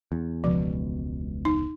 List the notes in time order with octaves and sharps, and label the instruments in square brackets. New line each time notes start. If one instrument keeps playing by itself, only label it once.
[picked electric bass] E2
[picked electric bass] E1 C#2 B2 [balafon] F3
[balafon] D#4